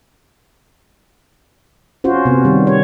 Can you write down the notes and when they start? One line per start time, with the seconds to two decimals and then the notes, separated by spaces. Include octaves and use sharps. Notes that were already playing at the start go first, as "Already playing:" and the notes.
2.04 C#4 F4 F#4 C5
2.25 C3 B3
2.45 D#3 G3
2.67 C#5